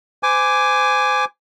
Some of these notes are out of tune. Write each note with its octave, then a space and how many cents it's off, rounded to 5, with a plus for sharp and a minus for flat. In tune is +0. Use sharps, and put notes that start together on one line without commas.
C5 -35 G#5 +0 D6 +0